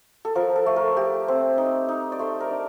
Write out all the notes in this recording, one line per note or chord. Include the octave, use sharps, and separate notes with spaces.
A4
F3 A#4
A4
A3
A#4
A3 G4
C4
D#4
D#4
D5
A3 C5
A#4
D4